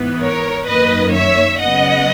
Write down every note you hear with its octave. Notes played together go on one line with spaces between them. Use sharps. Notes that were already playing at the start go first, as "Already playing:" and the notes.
Already playing: G#2 E3 B3
A#4 C#5
F#2 D#3 A#3 B4 D#5
C#5 E5
C#3 F#3 B3 D#5 F#5